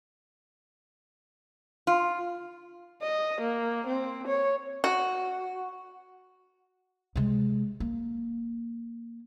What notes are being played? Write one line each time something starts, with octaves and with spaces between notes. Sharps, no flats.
F4
D#5
A#3
C4
C#5
F#4
C3 G#3
A#3